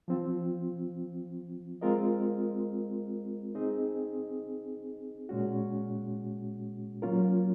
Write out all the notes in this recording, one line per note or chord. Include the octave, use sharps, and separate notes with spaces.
F3 C4 F4
G#3 C4 F4 A#4 D#5
C4 D#4 G#4 D#5
A#2 G#3 C#4 F#4
F#3 A#3 C#4 F4 A#4